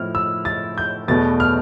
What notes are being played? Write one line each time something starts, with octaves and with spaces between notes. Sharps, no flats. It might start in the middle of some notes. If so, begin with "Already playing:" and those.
Already playing: A2 F3 C4 E4 F6
E6
A6
G6
E2 B2 A3 A6
F6